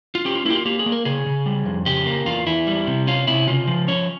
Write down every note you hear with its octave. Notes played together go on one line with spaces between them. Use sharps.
F4
C#4 G4
F4
A#3 E4
G4
F4
A#3 G4
G#4
A#3
A#4
C#3 G#4
C#3
G3
F2
C#3 G4
A#3
E2 F4
E2 E4
G3
C3
C#4 F4
C3 E4
C#3 F4
F3
C#4 C#5